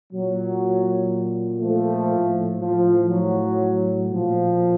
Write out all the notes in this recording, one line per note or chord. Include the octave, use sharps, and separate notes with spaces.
A#2 F#3
F3 A3
A2
F3
F#3
A#2 F3